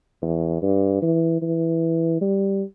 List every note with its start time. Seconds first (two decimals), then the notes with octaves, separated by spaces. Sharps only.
0.22 E2
0.62 G2
1.02 E3
1.42 E3
2.21 G3